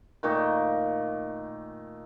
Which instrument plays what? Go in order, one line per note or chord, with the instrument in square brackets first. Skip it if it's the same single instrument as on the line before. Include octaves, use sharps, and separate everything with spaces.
[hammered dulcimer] A#2 D#3 A3 D#4